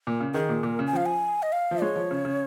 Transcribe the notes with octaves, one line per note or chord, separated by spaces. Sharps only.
A#2
C#3
D#3 G#4
A#2
A#2 A#4
C#3
G#5
F3 F5
G#5
D#5
F5
F3
G#3 C#5
F3
C#3
C#3